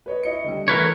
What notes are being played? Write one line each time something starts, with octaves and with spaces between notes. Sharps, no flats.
B4 C#5 D#5
E4 D#5 C#7
D3 G3
E3 A3 A#4 B4 C#5